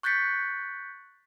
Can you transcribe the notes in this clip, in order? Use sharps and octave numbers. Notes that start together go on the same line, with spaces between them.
C#6 F#6 G6 A6 B6 C#7